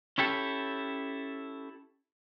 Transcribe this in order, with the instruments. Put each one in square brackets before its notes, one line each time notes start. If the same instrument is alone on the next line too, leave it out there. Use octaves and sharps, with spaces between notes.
[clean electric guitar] C#4 E4 G4 A4